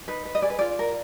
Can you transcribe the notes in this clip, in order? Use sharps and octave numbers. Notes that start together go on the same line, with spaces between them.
D#4 B4
B4
D#5
G#4 D5
B4
F4 D5
A#4